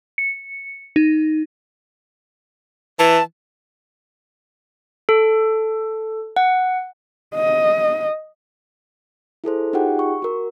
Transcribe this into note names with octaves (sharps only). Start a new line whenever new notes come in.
C#7
D#4
E3 A5
A4
F#5
D#5
E4 G#4 A4 C5
D#4 F4 G4 G#4 F#5 G5
C#6
F#4 A#4